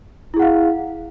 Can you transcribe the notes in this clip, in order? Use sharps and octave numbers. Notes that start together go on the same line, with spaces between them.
E4 G#4 F5 F#5